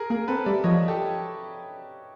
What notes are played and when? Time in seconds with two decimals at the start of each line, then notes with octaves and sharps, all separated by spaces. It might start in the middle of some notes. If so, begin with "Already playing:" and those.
Already playing: G#4 A#4
0.10 A#3 G#4 A#4
0.28 C4 A4 B4
0.46 G3 D5 E5
0.64 F3 C#5 D#5
0.88 G4 A4